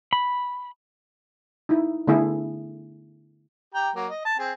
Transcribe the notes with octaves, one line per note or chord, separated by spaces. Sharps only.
B5
D#4 E4
D3 A3 B3 E4 G#4
G4 G5 A#5
F#3 A#3
D#5
A5
C4 G#4